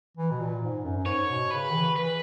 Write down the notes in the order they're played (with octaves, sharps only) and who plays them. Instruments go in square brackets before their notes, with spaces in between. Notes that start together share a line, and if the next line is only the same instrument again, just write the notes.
[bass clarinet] E3
B2
A#2
G#2
F#2
F#2
[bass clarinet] G#2 [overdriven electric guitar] C#5
[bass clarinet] B2
[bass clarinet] C#3 [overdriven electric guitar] B4
[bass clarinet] D#3
E3
[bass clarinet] E3 [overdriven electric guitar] B4